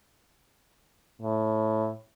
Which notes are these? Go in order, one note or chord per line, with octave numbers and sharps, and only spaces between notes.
A2